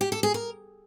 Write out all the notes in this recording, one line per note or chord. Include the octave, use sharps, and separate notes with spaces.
G4
A4
G#4
A#4